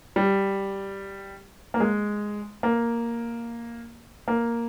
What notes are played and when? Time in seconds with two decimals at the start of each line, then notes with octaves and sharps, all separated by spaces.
0.16 G3
1.74 A#3
1.80 G#3
2.63 A#3
4.28 A#3